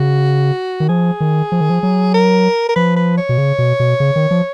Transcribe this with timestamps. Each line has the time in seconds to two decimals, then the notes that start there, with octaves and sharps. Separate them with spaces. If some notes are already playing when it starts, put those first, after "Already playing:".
Already playing: C#3 F#4
0.80 D#3
0.89 F3 G#4
1.20 D#3
1.52 F3
1.61 D#3
1.70 F3
1.83 F#3
2.14 A#4
2.69 A#4
2.76 F3 B4
2.96 B4
3.18 C#5
3.29 B2
3.38 C#3
3.58 B2
3.80 B2
4.00 C#3
4.16 D#3
4.31 F3